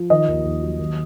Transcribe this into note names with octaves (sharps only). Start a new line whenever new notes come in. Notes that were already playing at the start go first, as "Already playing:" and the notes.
Already playing: F3
D#3 D#5
D#2
D#2
F#3
D#2